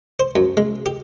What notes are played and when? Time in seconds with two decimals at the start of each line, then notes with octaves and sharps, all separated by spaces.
0.20 C5
0.36 F#2
0.57 G#3
0.86 G4